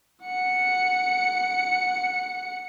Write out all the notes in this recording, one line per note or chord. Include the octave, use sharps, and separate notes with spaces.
F#5 C#7